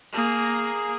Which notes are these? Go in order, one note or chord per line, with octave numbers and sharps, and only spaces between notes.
A#3 G#4